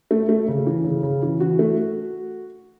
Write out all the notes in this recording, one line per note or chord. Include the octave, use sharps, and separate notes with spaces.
A3
A3
C#3
E3
C#3
C#3
E3
E3 F#4
A3